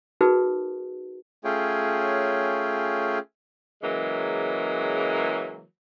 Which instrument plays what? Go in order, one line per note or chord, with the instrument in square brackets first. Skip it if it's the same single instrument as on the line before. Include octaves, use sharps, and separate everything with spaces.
[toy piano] D#4 F#4 G#4 A#4 B4
[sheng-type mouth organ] A3 C#4 F4 G#4 C#5 G5
[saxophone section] C#3 E3 F#3 G#3 A#3